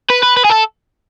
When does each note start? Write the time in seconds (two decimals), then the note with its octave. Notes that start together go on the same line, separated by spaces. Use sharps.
0.10 B4
0.23 B4
0.37 B4
0.44 G#4
0.50 A4